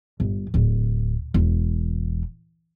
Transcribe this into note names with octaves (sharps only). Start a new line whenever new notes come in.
G1
D1
E1